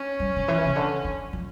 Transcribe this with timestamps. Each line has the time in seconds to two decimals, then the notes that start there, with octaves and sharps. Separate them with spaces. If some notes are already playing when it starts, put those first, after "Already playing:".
Already playing: C#4
0.20 G3
0.36 D3
0.48 E3
0.65 C#3
0.76 D3
1.04 E3
1.33 F3